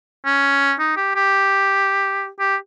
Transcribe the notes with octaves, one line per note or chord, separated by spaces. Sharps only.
C#4
D#4
G4
G4
G4